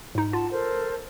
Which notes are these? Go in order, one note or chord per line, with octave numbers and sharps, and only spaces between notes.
G#2 D#4
F4 F#5 A5
A4 A#4 C5